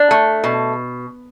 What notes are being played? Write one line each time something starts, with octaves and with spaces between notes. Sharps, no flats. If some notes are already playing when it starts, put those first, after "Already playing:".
Already playing: D4
A3
B2